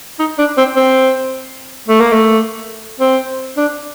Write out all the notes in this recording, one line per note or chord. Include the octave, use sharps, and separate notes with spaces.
D#4
D4
C4
C4
A3
A#3
A3
C4
D4